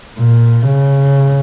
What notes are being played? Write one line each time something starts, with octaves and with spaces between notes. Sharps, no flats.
A#2
C#3